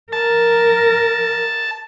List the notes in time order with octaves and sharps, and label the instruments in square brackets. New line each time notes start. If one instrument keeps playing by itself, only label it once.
[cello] A#4 [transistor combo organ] A5